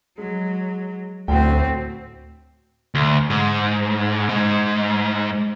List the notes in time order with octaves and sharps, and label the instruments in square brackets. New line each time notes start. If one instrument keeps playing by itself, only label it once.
[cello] F#3 [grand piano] G#3
[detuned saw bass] D2 [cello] A2 C4 [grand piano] F#4 G5
[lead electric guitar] D2
G#2
G#2